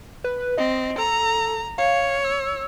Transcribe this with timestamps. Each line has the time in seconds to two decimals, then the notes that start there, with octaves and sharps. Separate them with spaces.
0.24 B4
0.58 C4 D#5
0.98 A4 A#5
1.78 C#5 F5
2.24 E6